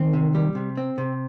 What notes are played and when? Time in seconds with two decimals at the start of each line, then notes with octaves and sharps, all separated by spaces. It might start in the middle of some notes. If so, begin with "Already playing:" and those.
Already playing: D#3 C4
0.13 C3
0.35 G3
0.55 C3
0.77 C4
0.98 C3